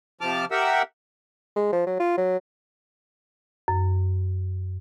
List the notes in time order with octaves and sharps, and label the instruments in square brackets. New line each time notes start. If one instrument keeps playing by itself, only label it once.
[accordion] C3 F3 A5 D6 F6
G4 A#4 E5 F#5 E6
[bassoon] G#3
F3
F#3
F4
F#3
[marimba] F#2